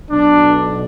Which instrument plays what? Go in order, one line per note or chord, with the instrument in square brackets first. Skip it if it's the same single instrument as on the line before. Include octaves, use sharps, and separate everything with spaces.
[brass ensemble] B1 B2 D4